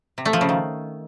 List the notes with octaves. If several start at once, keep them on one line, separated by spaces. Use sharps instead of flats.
C3
A3
F3
C#3
D#3